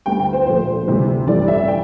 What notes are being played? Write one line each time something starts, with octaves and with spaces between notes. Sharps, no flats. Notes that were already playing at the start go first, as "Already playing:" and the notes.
D2 D3 G3 G5
G5
C5
A#1 A#2 A3 C5
D2 C3 E3 G3
A1 G2 E3 A3 D5
E5
G5